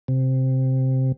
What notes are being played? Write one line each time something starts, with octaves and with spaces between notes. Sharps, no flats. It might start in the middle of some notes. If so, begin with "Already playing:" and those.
C3